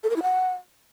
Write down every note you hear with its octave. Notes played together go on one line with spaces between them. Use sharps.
A4
A#4
E4
F#5